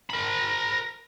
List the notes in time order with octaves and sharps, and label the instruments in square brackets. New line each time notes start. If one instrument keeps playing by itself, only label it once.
[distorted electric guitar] A#4 B5